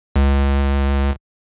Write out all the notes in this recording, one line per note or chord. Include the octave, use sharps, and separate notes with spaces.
C#2